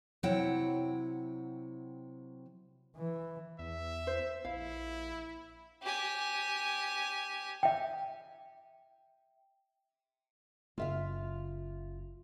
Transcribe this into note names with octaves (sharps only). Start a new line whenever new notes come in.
C3 F#3 E4 F#5 G5
E3
E2 E5
C5
A#1 E4 F5
G4 G#5
E5 G5
F#1 F4 E5 F5